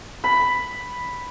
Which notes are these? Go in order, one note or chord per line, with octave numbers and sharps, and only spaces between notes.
B5